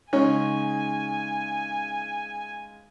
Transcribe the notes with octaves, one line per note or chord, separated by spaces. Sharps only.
C#3 G#3 C#4 D#4 G#5